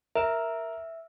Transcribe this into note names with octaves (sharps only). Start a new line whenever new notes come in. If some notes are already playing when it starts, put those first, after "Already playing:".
A#4 E5 E7